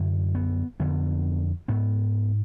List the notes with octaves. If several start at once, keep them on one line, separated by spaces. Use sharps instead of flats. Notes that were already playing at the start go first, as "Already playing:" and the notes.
Already playing: F#2 D3
B3
F2 D3 B3
G#2 B3